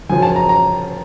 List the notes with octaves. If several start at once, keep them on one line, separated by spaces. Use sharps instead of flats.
F#2 C#3 F3 G#5
A5
A#5
A#5